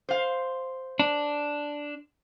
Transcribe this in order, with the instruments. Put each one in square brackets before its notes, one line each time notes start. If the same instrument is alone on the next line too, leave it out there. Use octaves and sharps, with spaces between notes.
[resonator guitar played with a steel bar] C5 F5
[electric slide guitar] D4